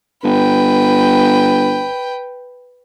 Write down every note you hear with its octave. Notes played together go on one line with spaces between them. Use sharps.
G1 B4 G5